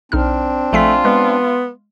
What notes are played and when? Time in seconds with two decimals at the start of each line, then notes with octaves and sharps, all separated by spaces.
0.12 B1 C4 D4 D#4 F6
0.73 A#1 A3 F4 G#5 B6
1.05 G#3 B3